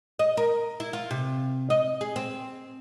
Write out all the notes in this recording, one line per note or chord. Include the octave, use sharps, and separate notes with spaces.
D#5
A#4
E4
F4
C3
D#5
G#4
C4